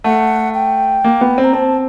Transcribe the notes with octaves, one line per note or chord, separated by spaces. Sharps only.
A3 F#5
G5
A#3
B3
C4
A#5
C4 A5